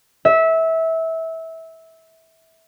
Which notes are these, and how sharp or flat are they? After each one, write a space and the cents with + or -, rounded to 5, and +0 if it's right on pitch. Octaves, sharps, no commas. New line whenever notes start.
E5 -20